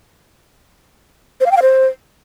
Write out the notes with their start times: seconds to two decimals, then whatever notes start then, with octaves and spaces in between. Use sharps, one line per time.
1.41 C5
1.46 F5
1.51 G5
1.57 F5
1.62 C5